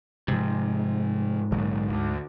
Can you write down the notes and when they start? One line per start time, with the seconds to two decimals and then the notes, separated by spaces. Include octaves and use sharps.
0.28 G#2 C3 F3
1.52 A#1 D3 F#3
1.90 D2